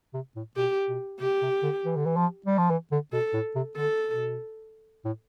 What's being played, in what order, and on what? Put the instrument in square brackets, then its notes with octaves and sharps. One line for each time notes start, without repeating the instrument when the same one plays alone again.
[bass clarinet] C3
A2
[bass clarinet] B2 [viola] G4
[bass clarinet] B2
[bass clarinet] C3 [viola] G4
[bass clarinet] C3
D3
E3
D3
E3
F3
G3
F3
E3
D3
[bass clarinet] B2 [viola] A4
[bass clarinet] A2
C3
[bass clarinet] D3 [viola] A4
[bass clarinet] B2
A2